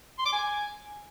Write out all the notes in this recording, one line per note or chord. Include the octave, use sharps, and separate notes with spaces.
C6
D6
G#5